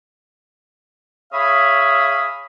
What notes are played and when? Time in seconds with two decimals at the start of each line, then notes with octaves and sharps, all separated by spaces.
1.33 G#4 C#5 E5 F5 B5 D#6